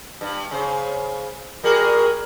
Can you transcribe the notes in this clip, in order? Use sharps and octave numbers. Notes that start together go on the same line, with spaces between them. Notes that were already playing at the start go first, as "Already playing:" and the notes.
G2
C#3 C5
G3 F#4 G#4 A#4